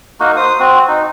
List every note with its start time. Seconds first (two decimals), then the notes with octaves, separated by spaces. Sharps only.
0.20 A#3 D#4 F#4
0.37 C5 D#6
0.60 C4 F#4
0.88 D#4